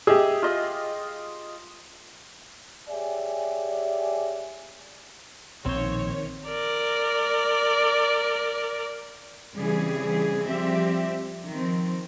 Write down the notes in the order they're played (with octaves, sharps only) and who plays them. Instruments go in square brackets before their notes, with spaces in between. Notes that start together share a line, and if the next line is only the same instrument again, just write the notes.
[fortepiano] G4 G#4 [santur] D#5 E5
[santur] F4 D#5
[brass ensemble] G4 G#4 C#5 D5 E5 G#5
[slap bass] A#1 B2 [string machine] D#3 [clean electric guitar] C4 C5 [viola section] C#5
[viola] A#4 D5
[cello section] C#3 E3 G3 C4 G#4
F3 G3 C4 G4 E5
D#3 F3 C4